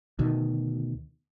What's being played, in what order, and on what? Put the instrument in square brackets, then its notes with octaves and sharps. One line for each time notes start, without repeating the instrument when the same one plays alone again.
[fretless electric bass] D2 B2 D#3